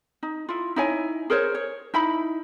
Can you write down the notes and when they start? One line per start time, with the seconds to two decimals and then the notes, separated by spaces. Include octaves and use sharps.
0.23 D#4
0.49 E4 F4
0.76 D#4 E4 C#5 G#5
1.30 G#4 A#4 C5 C#5
1.55 C#5
1.94 D#4 E4 B5